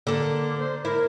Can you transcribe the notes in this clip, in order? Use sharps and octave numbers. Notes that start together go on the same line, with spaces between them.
D3 A#3 A4
C5
E4 A#4